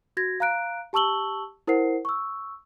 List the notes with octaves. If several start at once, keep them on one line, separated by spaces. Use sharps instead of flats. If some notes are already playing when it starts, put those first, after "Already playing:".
F#4 G#6 A#6
F5 A#5 F#6 D7
G4 A5 C#6 E6 F#7 G7
E4 A#4 C5 F#5 C7
C#6 E6